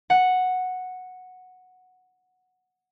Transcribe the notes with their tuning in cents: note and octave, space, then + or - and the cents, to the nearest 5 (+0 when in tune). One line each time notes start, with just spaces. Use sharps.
F#5 -5